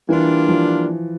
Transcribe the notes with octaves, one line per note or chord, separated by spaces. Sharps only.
E3 G3 A#3 D4 F4
F3